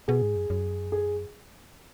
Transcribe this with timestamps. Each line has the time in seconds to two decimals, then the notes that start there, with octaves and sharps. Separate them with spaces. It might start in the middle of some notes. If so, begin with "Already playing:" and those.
0.08 B2 G#4
0.22 G#2
0.36 F#2
0.50 F#2
0.92 G#4